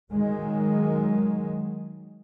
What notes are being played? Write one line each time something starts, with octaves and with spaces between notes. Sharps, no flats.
D#3 F#3 G#3